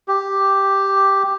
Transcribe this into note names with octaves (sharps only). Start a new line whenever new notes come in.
G4